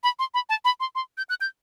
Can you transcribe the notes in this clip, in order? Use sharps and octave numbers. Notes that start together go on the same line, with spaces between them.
B5
C6
B5
A5
B5
C6
C6
G6
F#6
G6